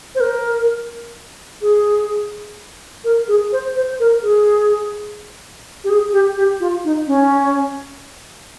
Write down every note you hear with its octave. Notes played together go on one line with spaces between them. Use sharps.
C5
A#4
G#4
A#4
G#4
C5
C5
A#4
G#4
G4
G#4
G4
G4
F4
D#4
C#4